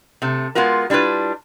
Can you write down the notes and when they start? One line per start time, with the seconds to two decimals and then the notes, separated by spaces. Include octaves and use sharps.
0.22 C3 A3
0.55 G#3 B3 F4 F#4 A#4
0.90 G3 D4 E4 F4 B4